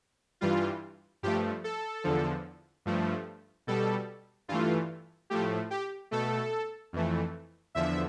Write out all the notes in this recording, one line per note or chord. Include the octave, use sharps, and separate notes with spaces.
G2 E3 G3 F4
G2 F3 A3 G4
A4
E2 D3 F3
G2 F3 A3
B2 G3 A4
G2 E3 A3 F4
A2 F3 A3 G4
G4
B2 A3 A4
F2 E3 A3
E2 D3 F3 E5